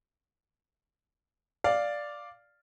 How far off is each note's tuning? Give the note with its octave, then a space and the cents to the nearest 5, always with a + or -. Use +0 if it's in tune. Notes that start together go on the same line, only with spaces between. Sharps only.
D5 +0 F5 +0